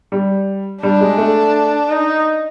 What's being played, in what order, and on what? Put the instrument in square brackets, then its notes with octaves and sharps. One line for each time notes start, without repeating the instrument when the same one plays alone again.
[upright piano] G3
[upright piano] G3 [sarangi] D4
[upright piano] G#3
A3
[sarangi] D#4